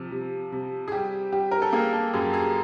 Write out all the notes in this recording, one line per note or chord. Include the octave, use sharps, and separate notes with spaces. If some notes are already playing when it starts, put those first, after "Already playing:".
Already playing: C3 F3
C3
C3
G#4
G3 G4
G3 G4
A#4
A4
A#3 G#4
A4
F#2 G#4
G#4